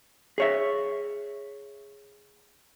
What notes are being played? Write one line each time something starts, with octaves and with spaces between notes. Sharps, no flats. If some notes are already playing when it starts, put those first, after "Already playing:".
G#4 C#5 E5